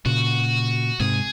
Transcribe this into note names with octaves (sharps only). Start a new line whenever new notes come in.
A#2 C#3 F#4
G#2 C3 G#4